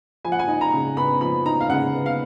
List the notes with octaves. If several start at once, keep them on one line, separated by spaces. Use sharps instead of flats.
F3 G#5
F#5
G#5
D#4
A#5
C#3
B3 B5
F3 B5
D#4 A#5
F5
C#3 F#5
B3
F5